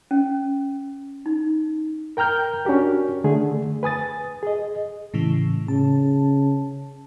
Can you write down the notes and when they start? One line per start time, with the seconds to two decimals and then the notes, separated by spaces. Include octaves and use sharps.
0.11 C#4
1.26 D#4
2.17 A#4 G5 A#5 F6 G6
2.65 C#4 D4 F#4 G4 A#4
3.24 D3 A3 G#4
3.83 B4 G#5 D#6 A6
4.43 G#4 D#5
5.14 A2 C#3 E3
5.68 C#3 A5